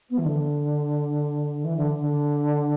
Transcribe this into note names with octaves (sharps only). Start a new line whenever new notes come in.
B3
E3
D3
E3
D3
D3